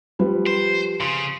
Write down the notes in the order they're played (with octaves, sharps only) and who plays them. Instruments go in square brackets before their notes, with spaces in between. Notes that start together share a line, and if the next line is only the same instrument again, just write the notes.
[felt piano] F3 G3 B4
[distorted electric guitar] C5
[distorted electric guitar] C#3 [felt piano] C6